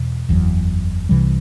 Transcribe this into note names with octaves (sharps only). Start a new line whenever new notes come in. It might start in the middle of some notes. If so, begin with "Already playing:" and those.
Already playing: E2 B2
F#1 E2 B2 F#3
C2 C3 E3 G3